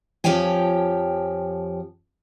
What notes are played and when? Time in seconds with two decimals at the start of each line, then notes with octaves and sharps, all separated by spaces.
0.24 F2 F3 G4 C#5 G5 G#5